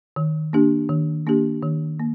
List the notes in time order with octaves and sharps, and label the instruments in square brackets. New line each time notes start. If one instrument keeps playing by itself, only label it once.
[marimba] D#3
A#3 D4 G4
D#3
A#3 D4 G4
D#3
A#3